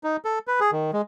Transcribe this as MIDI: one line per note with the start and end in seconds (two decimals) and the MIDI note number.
0.04 0.17 63
0.25 0.39 69
0.47 0.60 71
0.60 0.71 68
0.72 0.91 51
0.93 1.02 56